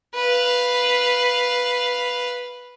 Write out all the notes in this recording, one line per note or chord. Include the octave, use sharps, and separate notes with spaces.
B4 F5